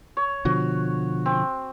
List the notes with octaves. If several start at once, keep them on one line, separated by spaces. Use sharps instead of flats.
C#5
B2 D3 F3 F#4
C4